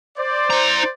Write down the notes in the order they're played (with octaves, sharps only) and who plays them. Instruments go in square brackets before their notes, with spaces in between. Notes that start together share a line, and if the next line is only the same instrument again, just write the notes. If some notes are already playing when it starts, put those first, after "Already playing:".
[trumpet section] C5 D5
[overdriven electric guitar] E4 A#5